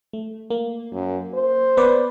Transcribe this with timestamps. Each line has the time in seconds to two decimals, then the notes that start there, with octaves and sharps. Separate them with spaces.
0.13 A3
0.50 A#3
0.93 F#2
1.34 C5
1.77 B3 B4 D5